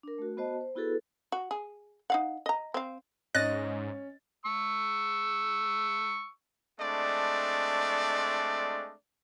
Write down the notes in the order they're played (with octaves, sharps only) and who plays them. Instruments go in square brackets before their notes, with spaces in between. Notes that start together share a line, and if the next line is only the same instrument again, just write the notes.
[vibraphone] D4 A#4
A3 F#4
B3 F#4 C5 D#5 A5
C5
B3 E4 F#4 G#4 A4 B4
[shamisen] F#4
G#4
D#4 F5 F#5
D#5 A#5
C4 F5
[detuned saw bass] G#2 [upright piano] C#4 A6 [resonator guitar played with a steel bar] D#5 [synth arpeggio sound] F#6 A#6
[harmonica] C#6 E6
[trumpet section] G#3 A3 C4 D4 D5